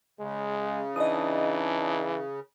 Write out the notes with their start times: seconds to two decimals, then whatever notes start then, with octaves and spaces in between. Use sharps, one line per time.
0.20 C#3 G#3
0.96 E3 D4 D#4 D#5 D#6